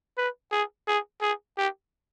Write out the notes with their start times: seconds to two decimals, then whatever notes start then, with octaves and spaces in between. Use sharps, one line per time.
0.18 B4
0.52 G#4
0.88 G#4
1.22 G#4
1.57 G4